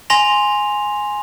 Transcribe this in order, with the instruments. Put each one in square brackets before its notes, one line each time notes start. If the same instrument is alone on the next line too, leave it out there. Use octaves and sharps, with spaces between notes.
[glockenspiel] G#5 C6 A#6 F7